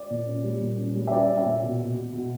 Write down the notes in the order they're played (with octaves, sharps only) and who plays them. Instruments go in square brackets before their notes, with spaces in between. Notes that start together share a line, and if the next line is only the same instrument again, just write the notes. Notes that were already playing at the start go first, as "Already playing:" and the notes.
Already playing: [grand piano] D5
A#2
C#4
G3
A#2
C#4
G3
E5
C#4 D5
C#4
E5
A#2
B2
B2
B2
B2